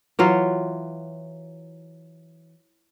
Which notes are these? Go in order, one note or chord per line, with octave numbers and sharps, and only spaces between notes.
E3 F#3 F4